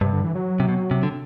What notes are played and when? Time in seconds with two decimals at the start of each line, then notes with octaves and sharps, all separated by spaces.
0.01 G2 C3
0.13 D3
0.24 E3
0.35 F#3
0.60 C3
0.69 B2
0.91 C3
1.03 D3